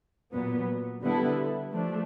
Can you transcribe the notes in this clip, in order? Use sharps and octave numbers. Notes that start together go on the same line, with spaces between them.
A#2 F#3 B3
D3 G3 B3 E4 A4
F3 A3 D4